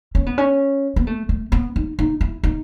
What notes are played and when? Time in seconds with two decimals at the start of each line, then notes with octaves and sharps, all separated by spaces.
0.15 C#4
0.26 B3
0.38 C#4
0.96 B3
1.07 A3
1.29 A3
1.52 B3
1.76 D#4
1.99 D#4
2.21 E4
2.44 D#4